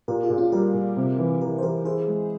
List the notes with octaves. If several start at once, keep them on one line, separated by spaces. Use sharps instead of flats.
A#2 G4 A#4
F4 G#4
A#2
C#4 F4
G3 G4 A#4
A#2
C3
E3
E3 G4 A#4
C5
E3 G4 A#4
E4 G#4 C5
G#3